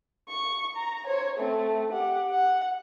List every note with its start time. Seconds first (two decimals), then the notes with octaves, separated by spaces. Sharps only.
0.29 C#6
0.76 A#5
1.07 C5 C#5
1.38 A3 C4
1.92 G4 F#5
2.30 F#5